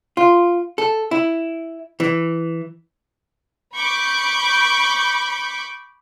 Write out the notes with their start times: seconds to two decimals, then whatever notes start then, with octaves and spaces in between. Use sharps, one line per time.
0.17 F4
0.78 A4
1.11 E4
2.00 E3
3.75 B5 C#6 D6 G6